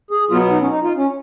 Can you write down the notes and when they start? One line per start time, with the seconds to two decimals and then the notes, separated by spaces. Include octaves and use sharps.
0.11 G#4
0.30 B2 F#3 B3 F4
0.51 D#4
0.60 C#4
0.70 D#4
0.84 F4
0.97 C#4